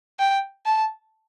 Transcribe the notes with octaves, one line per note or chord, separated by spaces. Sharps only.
G5
A5